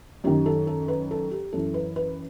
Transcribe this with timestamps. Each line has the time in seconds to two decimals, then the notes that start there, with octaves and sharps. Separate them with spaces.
0.24 F#2 D#3 G4
0.46 A4
0.67 A4
0.88 B4
1.11 A4
1.31 G4
1.53 F#2 E3 A4
1.74 B4
1.96 B4